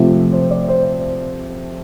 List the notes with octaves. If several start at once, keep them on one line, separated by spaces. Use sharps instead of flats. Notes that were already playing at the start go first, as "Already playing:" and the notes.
Already playing: C3 F3 A3 E5
C5
D5
C5